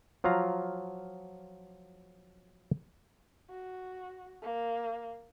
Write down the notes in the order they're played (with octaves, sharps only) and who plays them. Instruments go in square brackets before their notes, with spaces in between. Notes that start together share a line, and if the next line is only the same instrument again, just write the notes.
[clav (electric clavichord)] F3 F#3 F4 F5 A#5
[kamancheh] F#4
A#3